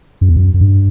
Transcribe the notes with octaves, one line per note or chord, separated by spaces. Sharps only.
F#2
E2
F#2
F#2
G2